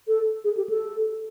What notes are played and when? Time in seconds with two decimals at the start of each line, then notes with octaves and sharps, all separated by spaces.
0.08 A4
0.44 G#4
0.57 G4
0.69 A4